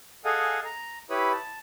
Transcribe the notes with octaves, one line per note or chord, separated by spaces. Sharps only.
G#4 A4 D#5 F5 F#5 G#5
A#5
E4 G4 B4 C#5 B5 D#6
A5